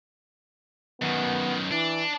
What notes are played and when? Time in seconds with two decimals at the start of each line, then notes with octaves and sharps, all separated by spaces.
1.01 F#2 D#3 B3
1.71 E3 D4